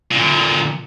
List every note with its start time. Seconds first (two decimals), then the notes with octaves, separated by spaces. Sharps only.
0.11 A#2 D3